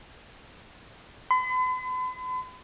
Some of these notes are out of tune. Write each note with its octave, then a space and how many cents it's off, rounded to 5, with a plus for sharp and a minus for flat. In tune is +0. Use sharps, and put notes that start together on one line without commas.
B5 +45